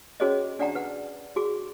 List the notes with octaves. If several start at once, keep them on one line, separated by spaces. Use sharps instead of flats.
C#4 F#4 G#4 C5 C#5 D#5
D4 D5 F#5 G5 A#5
B4 F#5
F#4 G#4 D6